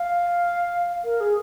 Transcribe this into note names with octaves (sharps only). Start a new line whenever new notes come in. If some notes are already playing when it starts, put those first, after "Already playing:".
Already playing: F5
A#4
G#4